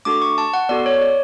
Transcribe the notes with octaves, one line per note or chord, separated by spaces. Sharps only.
A3 D4 F#4 A4 D6
C#6
A5
F#5
B3 F#4 A4 D5
C#5
D5